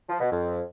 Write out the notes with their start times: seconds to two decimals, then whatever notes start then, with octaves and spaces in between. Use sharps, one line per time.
0.09 F3
0.20 B2
0.31 F2